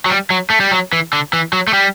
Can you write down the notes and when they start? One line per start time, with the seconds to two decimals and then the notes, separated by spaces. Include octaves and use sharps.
0.06 F#3
0.10 G3
0.30 F#3
0.50 A3
0.60 G3
0.72 F#3
0.93 E3
1.13 D3
1.33 E3
1.53 F#3
1.68 A3
1.73 G3